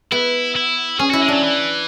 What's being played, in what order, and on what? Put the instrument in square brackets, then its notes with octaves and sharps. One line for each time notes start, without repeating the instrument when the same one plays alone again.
[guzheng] B3 [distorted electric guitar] E4
[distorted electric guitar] E4
[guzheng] C#4 [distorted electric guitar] G#4
[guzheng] E4 [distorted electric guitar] F#4
[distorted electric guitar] G#3
[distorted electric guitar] F#3 [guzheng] D4
[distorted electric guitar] E3